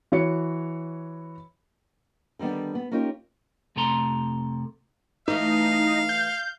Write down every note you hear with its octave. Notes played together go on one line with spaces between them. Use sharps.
E3 F#4 C#5 C#7
D3 D#3 G3 B3 D4
B3
A#3 C#4 D#4 F4 G4 A#4
F2 C3 A3 A4 A#5 C6
E3 A3 D#4 F5
G6